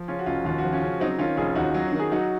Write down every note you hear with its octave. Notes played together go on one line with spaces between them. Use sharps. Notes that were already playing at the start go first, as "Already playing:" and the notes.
Already playing: F3
C#3 C#4 F4
F#4
F1 C#4 F4
D#2 F4
F#4
F3
C#4 F4
C#3
F#3 C4 D#4
D#3 C#4 F4
F1 F4 G#4
D#2 D#4 F#4
F#3
D#3
G#4
F#3 D#4 F#4